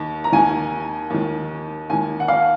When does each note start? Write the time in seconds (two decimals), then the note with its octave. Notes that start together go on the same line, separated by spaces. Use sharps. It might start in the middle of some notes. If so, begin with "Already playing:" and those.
Already playing: D#2 D#3
0.24 A#5
0.32 D#2 D#3 G#5
1.10 D#2 D#3
1.90 D#2 D#3 G#5
2.20 F#5
2.28 F5